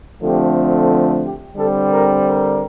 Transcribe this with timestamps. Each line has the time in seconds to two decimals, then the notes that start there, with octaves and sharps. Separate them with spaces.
0.22 D3 F3 A3 C4 G4
1.23 G4
1.56 D3 G3 C4 A4
1.91 A#4
2.24 A#4